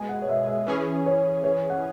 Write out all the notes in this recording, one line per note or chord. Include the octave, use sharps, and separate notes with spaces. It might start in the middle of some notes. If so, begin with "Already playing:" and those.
Already playing: B2 G#3 G#4 G#5
F#5
C#5
E5
E5
E3 C#4 G#4
C#5
C#5
F#5